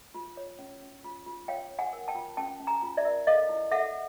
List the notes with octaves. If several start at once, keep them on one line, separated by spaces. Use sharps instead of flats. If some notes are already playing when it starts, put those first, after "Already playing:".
F4
C#5
C#4
C#4
F4
F4
C#5 F5 G5
C#5
F#5 G#5
A#4
G5 A5
F4
C#4 G5 A5
C#4
G#5 A#5
F4
D5 E5
A#4
A4 D#5 F5
E4
A4 E5 F#5